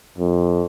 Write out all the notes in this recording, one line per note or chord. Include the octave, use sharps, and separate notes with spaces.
F2